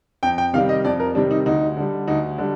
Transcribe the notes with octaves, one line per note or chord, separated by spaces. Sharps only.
F2 G5
G5
C3 D#3 G3 F5
D#5
F2 D5
A#4
C3 D#3 G3 D4
D#4
D2 D#4
D3 G3
D2 D#4
D3 G3